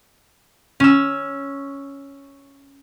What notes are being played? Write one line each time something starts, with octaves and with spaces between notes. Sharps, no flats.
C#4 E6